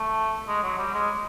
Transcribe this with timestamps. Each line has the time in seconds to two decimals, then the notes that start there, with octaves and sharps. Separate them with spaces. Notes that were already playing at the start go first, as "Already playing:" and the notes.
Already playing: A3
0.48 G#3
0.63 F#3
0.78 G3
0.94 G#3